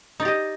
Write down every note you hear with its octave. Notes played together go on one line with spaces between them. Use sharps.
D#4 G4 D5 D#5